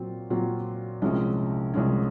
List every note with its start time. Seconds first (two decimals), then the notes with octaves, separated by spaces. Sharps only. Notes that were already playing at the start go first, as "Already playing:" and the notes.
Already playing: A#2 F#3 C4 F4
0.30 A#2 F#3 C4 F4
1.02 C2 C3 F3 G#3 C#4
1.74 C2 C3 F3 G#3 C#4